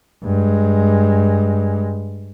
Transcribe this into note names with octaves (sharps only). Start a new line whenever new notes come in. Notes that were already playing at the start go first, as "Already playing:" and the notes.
G2 G#3